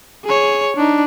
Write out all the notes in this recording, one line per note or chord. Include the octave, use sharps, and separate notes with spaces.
G#4 C#5
D4 D#4